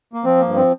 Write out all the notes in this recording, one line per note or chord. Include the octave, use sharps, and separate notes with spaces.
A#3
F3 C4
G2 A#3
C4